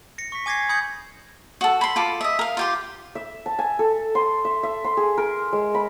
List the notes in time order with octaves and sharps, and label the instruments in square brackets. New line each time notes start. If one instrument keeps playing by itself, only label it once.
[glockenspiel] A#6 C#7
C#6 B6
G#5 D6 G#6 A#6 C7
B5 D#6 G6 G#6 C#7 F#7
[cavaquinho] F#4 A4
B5 C6
F4 A4 D6
D#5 E5
A#4 F5
F4 G4 C6
[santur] E5
A5
G#5
A4
C6
E5
E5
C6
G#4
A#4
G#3
B5